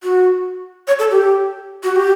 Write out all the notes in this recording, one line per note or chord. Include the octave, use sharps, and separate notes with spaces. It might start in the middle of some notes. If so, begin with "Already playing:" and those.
F#4
C#5
A4
G4
F#4
G4